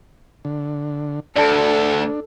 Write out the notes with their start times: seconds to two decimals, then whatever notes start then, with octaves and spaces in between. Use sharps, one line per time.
0.45 D3
1.36 D2 D4 A4 D5 A5 D7